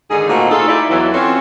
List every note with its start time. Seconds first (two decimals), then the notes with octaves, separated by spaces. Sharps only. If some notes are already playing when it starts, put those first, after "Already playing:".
0.10 G#2 D3 D#3 D#4 G#4
0.28 A#2 A3 A#3 C4 D#4 F#4
0.51 D#4 F4 G#4 A4
0.68 D#4 E4 D5
0.90 E2 E3 F#3
1.14 C4 C#4 F4 F#4 A4 C#5